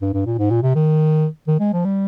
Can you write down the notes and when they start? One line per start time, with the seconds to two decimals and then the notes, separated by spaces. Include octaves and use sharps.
0.02 G2
0.14 G2
0.26 A#2
0.39 G#2
0.51 A#2
0.63 C3
0.75 D#3
1.48 D#3
1.60 G#3
1.73 F3
1.85 G3